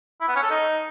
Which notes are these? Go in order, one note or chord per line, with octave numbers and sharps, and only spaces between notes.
E4
B3
C#4
A4
D#4